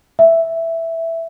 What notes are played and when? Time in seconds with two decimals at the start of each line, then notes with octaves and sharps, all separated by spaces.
0.19 E5